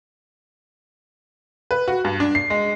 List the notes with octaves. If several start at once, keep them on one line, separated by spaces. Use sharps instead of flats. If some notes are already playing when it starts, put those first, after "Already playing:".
B4
F#4
G2
D4
C7
G#3